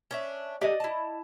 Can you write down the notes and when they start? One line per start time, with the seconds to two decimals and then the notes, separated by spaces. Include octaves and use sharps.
0.11 C#4 D4 E5
0.61 D3 G4 D5 D#5
0.80 E4 A5